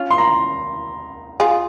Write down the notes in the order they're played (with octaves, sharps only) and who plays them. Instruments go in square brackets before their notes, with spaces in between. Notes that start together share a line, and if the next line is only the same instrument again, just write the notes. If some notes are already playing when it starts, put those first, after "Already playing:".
Already playing: [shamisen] C#4 F4
[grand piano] C6
A#5
[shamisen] F4 G#4